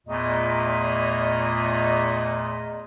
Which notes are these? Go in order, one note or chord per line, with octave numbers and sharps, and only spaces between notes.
E2 A#2 A3 D#5